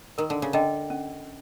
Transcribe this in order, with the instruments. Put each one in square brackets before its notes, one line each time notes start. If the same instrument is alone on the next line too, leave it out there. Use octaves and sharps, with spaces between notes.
[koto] D#3 [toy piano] A#4
[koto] D3
C#3
[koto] D3 [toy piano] D#5 G5
[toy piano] C#4